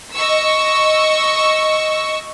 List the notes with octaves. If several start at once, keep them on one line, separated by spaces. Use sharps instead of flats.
D#5 C#6 E6